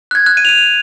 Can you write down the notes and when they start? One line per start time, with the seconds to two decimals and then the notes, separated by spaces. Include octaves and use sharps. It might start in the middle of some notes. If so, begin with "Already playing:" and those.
0.11 F#6
0.15 G#6
0.26 F#6
0.37 D#7
0.45 F7
0.49 D#7